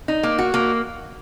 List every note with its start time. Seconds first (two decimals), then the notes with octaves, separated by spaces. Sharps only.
0.08 D#4
0.23 A#3
0.39 F#4
0.54 A#3